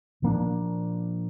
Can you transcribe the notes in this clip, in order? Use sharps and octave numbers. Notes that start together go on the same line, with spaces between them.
A#2 F3 A#3 D4